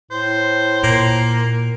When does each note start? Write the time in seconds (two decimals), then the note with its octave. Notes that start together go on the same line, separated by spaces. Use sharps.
0.11 A2 C5
0.84 A#2 A#3